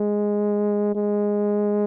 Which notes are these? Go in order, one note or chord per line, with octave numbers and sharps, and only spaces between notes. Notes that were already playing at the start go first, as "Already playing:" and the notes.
Already playing: G#3
G#3